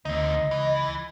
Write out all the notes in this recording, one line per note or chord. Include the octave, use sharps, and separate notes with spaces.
D2 C4 D#4 D#5
C#2
E3